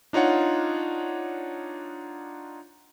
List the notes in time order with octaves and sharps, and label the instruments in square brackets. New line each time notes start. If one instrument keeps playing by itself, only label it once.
[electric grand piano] D4 D#4 F4 C#5 F#5